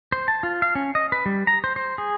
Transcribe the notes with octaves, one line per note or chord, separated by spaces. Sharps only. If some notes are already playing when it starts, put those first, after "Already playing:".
C5
A5
F4
F5
C#4
D#5
B4
G3
A#5
C5
C5
G#4